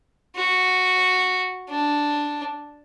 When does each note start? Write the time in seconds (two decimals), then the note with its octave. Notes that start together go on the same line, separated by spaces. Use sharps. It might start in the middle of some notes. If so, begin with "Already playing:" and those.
0.35 F#4
1.70 D4